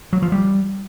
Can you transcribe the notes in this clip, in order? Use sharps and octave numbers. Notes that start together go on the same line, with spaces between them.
F#3
F3
G3